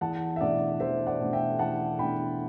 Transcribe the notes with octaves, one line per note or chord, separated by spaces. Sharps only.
E2 F#5 A5
E5
B2 A3 D4 D5 F#5
E2 C5 E5
D5 F#5
B2 A3 D4
E5 G5
E2 F#5 A5
B2 A3 D4 G5 B5